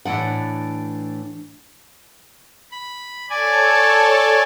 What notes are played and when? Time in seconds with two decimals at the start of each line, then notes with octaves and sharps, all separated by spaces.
0.05 A2 E3 G#3 D4 F#5
2.71 B5
3.30 A4 C#5 D5 G#5 A5